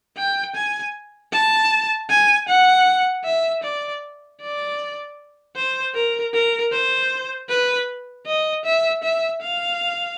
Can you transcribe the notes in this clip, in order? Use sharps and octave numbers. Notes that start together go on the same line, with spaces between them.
G5
G#5
A5
G#5
F#5
E5
D5
D5
C5
A#4
A#4
C5
B4
D#5
E5
E5
F5